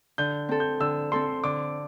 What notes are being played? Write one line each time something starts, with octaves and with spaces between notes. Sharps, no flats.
D3 G6
C4 A4
G6
D3 E6
C4 A4 C6
D3 D6